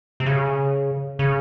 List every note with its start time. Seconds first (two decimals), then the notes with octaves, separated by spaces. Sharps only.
0.20 C3
0.26 C#3
1.19 C#3